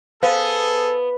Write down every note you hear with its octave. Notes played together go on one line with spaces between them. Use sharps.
B3 G#4 A4 C5 F5